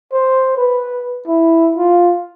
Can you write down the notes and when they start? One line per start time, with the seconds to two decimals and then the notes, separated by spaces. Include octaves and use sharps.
0.13 C5
0.57 B4
1.27 E4
1.76 F4